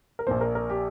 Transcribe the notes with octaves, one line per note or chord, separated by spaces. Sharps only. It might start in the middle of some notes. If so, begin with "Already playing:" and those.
A#4
A#1 A#2 F3 C5
A#4
A#4
G4